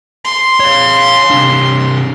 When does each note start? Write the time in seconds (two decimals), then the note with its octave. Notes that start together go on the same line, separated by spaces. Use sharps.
0.25 C6
0.60 C#5 F5
1.31 C3 D4